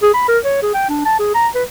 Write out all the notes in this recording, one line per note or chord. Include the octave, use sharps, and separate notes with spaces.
G#4
B5
A#4
C#5
G#4
G5
D4
A5
G#4
A#5
B4